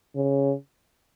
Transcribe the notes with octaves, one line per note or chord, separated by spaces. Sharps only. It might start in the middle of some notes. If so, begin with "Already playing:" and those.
C#3